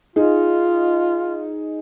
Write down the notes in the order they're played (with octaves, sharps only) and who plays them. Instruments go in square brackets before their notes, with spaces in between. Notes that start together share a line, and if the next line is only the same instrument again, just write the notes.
[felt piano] D#4 G#4 [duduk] F4